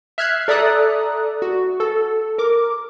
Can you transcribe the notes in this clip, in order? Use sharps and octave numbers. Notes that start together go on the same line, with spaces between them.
E5 F6 F#6 G#6 B6 C7
A4 D5 E5 A#5 D#6 F#6
F#4
A4
A#4 D6